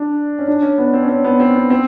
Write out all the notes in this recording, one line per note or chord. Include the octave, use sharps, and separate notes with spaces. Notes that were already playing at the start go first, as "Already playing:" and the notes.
Already playing: D4
C#4
D4
C#4
B3
C4
C#4
C4
B3
C4
B3
C4